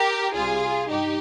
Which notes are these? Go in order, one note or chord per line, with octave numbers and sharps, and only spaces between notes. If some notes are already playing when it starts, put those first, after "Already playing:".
Already playing: G4 A#4
C2 C3 G3 F4 G#4
G2 D#4 G4